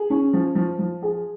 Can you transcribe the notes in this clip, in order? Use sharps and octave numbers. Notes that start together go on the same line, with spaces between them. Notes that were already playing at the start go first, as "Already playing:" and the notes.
Already playing: G#4
C#4
F3
F3
F3
G#4